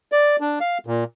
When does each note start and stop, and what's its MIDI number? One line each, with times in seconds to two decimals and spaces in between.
0.12 0.36 74
0.41 0.59 62
0.61 0.78 77
0.86 1.04 46